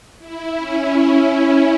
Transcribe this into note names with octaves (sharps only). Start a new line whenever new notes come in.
E4
C#4